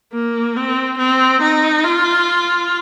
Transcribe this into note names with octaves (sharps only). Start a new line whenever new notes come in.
A#3
C4
C4
D#4
F4